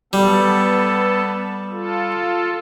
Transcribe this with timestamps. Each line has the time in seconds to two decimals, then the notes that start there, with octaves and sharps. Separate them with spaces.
0.13 G3 B3 A4
1.70 F4 A4